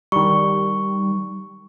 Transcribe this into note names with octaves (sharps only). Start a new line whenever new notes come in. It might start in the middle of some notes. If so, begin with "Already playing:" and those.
D#3 G3 C#6